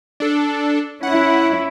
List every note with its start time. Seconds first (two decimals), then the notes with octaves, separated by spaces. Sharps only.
0.20 D4 A4
1.03 C#4 E4 F#5